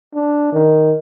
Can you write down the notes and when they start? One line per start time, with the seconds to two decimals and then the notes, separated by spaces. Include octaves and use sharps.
0.14 D4
0.53 D#3